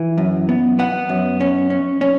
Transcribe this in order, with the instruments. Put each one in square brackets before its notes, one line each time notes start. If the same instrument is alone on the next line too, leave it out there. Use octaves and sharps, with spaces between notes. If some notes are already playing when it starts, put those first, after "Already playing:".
Already playing: [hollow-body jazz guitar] E3
F#2
B3
B3 F#5
F#2
C#4
C#4
C#4